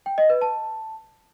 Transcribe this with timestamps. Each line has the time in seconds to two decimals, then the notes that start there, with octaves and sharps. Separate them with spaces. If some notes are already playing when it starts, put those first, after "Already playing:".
0.06 G5
0.18 D#5
0.30 B4
0.41 A5